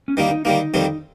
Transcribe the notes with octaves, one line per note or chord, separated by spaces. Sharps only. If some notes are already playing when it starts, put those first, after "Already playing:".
C#4
D#3 G3 A#3 D#4
D#4
D#3 G3 A#3 D#4
F2 D#3 G3 C4